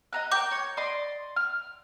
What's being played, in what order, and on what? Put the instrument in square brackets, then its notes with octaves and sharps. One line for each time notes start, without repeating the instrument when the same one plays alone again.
[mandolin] D#5 A#5 F#6
[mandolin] A#4 G5 [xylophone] D6 G6
[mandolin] C#5
D5 D#5 C6
F6